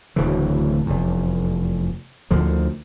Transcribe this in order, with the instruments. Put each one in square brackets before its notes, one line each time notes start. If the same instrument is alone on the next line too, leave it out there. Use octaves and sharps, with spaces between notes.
[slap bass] D1 D2 C#3 E3
F1 E2
D2 D3 D#3 F3